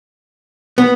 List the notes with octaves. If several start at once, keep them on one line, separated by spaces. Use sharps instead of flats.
B3